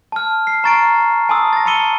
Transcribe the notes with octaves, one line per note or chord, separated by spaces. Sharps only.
A5 F6
C7
A#5 C#6 A6 C7 D7
G#5 A5 C6 D#6 E6
A6 A#6
A5 B5 E6 C#7 D#7 G7